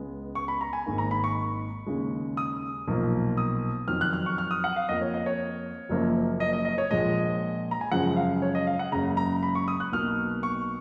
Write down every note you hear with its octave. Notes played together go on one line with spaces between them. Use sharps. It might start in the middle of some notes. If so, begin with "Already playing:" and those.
Already playing: C#2 C#3 G#3 B3
C#6
B5
A#5
G#5
G#1 G#2 D#3 A#3
A#5
B5
C#6
D#2 C#3 G#3
D#6
B1 A#2 F3 A#3
D#6
F2 D#3 F#3 F6
F#6
F6
C#6
F6
D#6
F#5
F5
F2 F3 A#3 D#5
C#5
D#5
C#5
F#1 F#2 F3 A#3
D#5
D#5
D#5
C#5
A#1 A#2 F3 G#3 D#5
A#5
G#5
F#2 C#3 F3 G#3 F#5
F5
C#5
D#5
F5
F#5
F#1 F#2 C#3 G#3 A#5
A#5
B5
C#6
D#6
F#6
B1 B2 A#3 F6
C#6